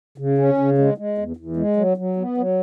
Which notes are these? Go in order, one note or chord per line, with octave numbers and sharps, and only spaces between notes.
C#3
C#4
C#3
G#3
G#3
E2
E2
G#3
F#3
F#3
B3
F#3